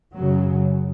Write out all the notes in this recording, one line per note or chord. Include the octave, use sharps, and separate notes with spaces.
F#2 C#3 F#3